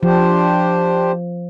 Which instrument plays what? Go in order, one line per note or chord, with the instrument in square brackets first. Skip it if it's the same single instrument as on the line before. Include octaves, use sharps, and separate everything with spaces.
[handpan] F3 [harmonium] D4 G4 C5